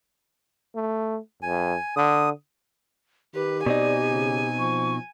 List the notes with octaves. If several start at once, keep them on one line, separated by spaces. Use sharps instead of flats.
A3
F2 G#5
D3 D#6
D#3 G4 B4
B2 C4 D#4 D5 G#5
C#3
F3 C#6